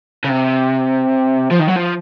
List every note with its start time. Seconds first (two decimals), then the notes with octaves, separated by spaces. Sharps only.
0.24 C#3
0.29 C3
1.51 F3
1.60 D#3
1.69 F#3
1.76 F3